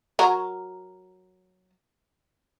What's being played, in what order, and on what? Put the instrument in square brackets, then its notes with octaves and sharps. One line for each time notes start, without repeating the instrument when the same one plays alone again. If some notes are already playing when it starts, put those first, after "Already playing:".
[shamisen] F#3 A#4